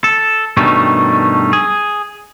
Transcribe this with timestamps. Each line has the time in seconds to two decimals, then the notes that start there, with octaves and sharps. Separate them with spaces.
0.04 A4
0.57 G2 B2 D#3 G3 A3 C#4
1.53 G#4